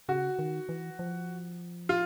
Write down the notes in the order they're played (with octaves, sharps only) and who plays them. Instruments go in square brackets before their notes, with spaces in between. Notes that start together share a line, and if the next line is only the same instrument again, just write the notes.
[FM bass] C#3 [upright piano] F#4
[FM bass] D#3
E3
F3
[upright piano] F4